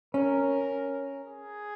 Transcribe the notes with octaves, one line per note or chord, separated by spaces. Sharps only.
C#4 A#4
G#4